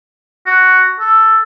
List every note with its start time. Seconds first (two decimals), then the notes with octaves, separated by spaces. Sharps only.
0.46 F#4
1.00 A4